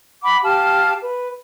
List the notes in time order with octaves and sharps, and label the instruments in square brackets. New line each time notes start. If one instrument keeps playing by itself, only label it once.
[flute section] F#5 B5 D6
G4 F5 A5 F6
B4